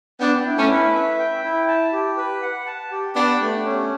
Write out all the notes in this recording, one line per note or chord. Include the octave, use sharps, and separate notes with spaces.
B3 D4 G5
E4
A3 C#4
B4
E5
G5
E4
A5
G4
B4
F#5
A5
G4
B3 D4 G4
A3
C#4